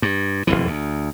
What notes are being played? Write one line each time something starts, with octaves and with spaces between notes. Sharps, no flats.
G2
E1 B1 F2 E3
D2